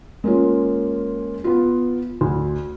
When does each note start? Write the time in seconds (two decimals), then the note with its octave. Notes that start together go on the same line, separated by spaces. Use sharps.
0.24 G#3 A#3 C#4 F4
1.44 B3 F4
2.21 D2